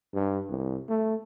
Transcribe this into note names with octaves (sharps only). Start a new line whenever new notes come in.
G2
C2
A3